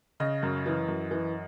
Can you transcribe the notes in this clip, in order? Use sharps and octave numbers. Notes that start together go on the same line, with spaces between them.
C#3 D#5
F#2
E3
F#2
E3